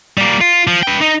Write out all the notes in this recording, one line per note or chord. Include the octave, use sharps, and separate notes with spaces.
G3 A#3
F4
F3
B4 G5
D#4